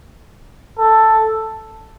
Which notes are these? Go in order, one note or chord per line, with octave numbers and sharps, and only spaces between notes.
A4